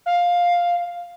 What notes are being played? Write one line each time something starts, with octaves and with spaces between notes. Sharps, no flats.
F5